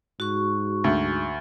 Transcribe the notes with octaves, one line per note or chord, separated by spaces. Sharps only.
G#2 F#4 C#6
D2